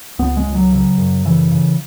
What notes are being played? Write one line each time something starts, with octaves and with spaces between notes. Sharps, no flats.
C#2 B3
G#3
C#2
F#3
C#3 F#3
F#2
C#3 E3
C#3